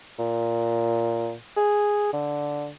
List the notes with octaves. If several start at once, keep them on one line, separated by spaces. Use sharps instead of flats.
A#2
G#4
D3